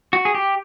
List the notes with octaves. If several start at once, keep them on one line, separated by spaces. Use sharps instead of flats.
F#4
G#4
G4